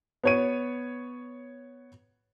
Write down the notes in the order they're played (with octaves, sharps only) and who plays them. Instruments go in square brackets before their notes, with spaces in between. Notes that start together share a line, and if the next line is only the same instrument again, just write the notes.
[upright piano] B3 C#5 D#7